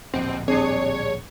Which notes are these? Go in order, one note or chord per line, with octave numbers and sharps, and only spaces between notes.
D1 A#1 A#2 C4
G3 C4 D4 G#4 C#5